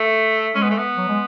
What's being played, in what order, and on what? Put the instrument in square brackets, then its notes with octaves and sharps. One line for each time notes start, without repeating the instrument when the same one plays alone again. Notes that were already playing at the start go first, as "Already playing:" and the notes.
Already playing: [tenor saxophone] A3
[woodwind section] G#3 [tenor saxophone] C#4
[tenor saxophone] B3
A3
B3
[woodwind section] F#3
G#3